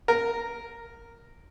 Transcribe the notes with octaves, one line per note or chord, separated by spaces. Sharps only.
A#4